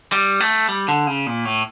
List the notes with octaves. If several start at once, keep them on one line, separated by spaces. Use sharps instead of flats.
G3
A3
G3
D3
C#3
A#2
A2